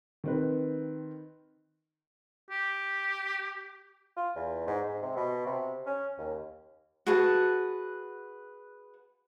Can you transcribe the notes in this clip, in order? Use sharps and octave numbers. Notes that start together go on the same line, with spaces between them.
D#3 C4 B4
G4
F4
E2
G#2
G#2
C3
B2
C3
C#4
D#2
F#4 G#4 B4 A5